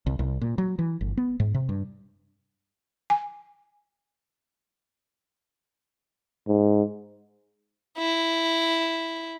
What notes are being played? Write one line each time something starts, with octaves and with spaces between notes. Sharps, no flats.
C2
C2
A#2
F#3
E3
G1
B3
G#2
C3
G2
G#5
G#2
E4